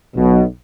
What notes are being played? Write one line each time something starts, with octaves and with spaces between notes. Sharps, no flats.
B1 B2